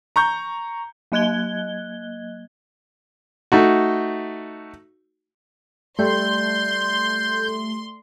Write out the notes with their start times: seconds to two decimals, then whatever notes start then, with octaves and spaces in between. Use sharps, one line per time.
0.16 A#5 C#6 G6
1.12 F#3 A#3 D#5 F#6 G#6 G7
3.52 A3 D#4 F#4
5.99 G3 A3 C6 G6